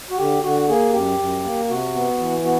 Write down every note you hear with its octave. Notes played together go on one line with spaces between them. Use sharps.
F#4
D3 G4
D3 F#4
A#3 G#4
F#2 G4
F#2
A#3
C3 F#4
B3
E3
B3 F#4